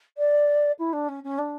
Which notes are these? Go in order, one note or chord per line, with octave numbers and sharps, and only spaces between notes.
D5
E4
D4
C#4
C#4
D4